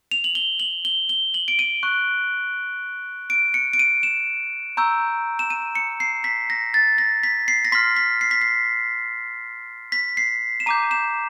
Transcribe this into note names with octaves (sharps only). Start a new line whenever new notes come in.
F7
F#7
G7
F#7
G7
G7
F#7
D7
D#7
C#6 F#6
D7
C#7
D7
D#7
E7
A#5 C#6 E6 G6
E7
D#7
C#7
C7
B6
A#6
A6
A#6
B6
C7
A#6
C6 F6 B6
B6
C7
B6
C7
B6
C7
E7
A#5 D6 G6 D#7
E7